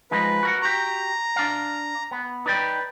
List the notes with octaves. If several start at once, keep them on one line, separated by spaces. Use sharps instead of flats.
F3 G#3 D#4 B4
F#4 A#4 F#5
F#4 G4 A#5
D4 F5
B3
D#4 B4 D5 G5